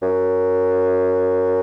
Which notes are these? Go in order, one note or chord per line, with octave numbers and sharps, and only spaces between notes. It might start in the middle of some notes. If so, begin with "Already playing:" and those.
F#2